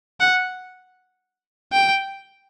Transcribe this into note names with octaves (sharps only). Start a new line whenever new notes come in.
F#5
G5